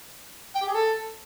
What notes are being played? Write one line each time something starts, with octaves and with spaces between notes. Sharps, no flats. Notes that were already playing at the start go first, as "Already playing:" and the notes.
G5
G4
G#4
A4